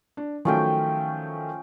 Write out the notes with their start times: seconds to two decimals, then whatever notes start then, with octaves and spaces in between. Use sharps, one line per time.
0.17 D4
0.45 D#3 F3 F#3 A3 C#4 G5